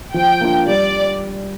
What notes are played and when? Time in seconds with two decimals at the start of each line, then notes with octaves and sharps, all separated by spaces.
0.14 F3 G5
0.41 A#3 D4 F4
0.67 G3 D5